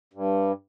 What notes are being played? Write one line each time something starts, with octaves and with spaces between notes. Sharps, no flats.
G2